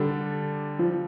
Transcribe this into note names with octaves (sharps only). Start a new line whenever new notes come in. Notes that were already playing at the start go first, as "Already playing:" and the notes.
Already playing: D3 G3 D4 A4
F3